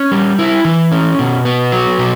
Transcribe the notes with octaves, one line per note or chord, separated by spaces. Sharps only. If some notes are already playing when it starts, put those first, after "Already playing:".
Already playing: C#4
G3
E4
E3
C#4
B2
B3
F#3
B2